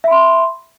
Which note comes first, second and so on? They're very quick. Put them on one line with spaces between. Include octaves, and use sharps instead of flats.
E5 B5 C6